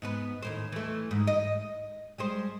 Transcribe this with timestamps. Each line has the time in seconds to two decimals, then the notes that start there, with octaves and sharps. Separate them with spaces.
0.02 G#2 B3 B4
0.42 D#2 A2 C5
0.72 E3 A3
1.11 G#2
1.27 D#5
2.18 G3 G#3 C5